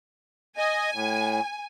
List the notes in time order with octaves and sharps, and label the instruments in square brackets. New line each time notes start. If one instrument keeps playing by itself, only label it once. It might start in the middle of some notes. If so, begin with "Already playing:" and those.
[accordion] D#5 [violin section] G#5
[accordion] A2